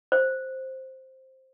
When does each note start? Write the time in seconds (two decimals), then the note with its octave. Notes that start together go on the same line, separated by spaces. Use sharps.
0.12 C5